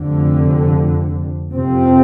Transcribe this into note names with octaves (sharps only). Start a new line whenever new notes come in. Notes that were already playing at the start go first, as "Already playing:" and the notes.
Already playing: F1 F2 D3
F2 C3 F3 C4